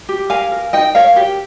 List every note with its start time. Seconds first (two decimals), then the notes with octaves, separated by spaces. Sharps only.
0.09 G4
0.30 A#4 F5 G#5
0.52 A#4
0.73 D#4 D#5 G5
0.95 A#4 C#5 F5
1.16 G4